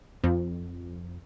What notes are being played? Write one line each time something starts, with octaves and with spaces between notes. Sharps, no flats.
F2